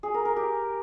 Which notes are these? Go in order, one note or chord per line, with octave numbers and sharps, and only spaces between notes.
G#4
A#4
A#4
G4